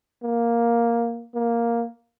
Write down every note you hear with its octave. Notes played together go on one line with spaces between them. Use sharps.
A#3
A#3